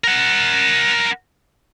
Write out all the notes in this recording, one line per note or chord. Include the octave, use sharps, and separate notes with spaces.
A#4 F#5